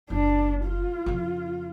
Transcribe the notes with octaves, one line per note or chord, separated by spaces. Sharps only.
F#1 D4
F4
F2 C#3